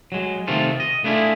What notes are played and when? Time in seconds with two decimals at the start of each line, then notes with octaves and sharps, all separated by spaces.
0.12 F#3 G#3
0.48 C3 D#3 A3 C4 F4 A4
0.80 D#5
1.04 A3 B3 D4 E4 F4 G#4